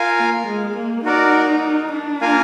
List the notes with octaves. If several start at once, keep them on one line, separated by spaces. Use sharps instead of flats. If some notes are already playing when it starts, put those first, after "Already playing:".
Already playing: F4 A#4 F5 G#5
A#3
G#3
A#3
D#4 F#4 A#4 D5
D4
A#3 F4 A#4 F5 G#5